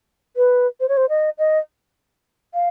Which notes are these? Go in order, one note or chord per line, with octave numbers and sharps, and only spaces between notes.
B4
C5
C#5
C5
D#5
D#5
F5